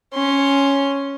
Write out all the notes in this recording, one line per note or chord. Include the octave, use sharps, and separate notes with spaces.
C#4 C6